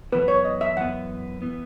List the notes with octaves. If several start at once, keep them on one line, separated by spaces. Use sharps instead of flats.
F#2 E3 B3 B4
C#5
D#5
E5
F#2 E3 B3 F#5
E3 B3